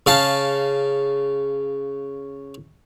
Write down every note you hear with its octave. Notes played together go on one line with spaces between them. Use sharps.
C#3 F5 A5